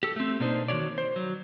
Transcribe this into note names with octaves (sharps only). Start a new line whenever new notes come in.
G4 A4
A3 C4
B2 A#3 D4 D#4 C5
D#3 F#4 G#4 C#5 D5
C5
F#3